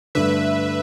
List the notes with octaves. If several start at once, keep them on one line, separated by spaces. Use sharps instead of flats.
G2 D3 A3 D4 B4 E5